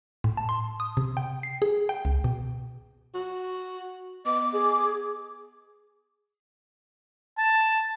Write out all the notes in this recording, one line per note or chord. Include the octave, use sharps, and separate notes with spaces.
A2
A5
C6
D#6
C3
G5
C7
G#4
G5
C#2
B2
F#4
B3 D#5 D6
G#4
A5